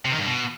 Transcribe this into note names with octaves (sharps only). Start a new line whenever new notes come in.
C3
D#3
G2
B2